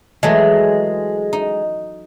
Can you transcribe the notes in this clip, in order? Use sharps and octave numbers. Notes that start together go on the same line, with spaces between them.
E3 F#3 G#3 A3
D#4